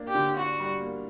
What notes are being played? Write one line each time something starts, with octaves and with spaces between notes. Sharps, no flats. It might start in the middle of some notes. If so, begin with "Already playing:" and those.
Already playing: A#3 D4
G4
D3
D4 F#4
G3
A#3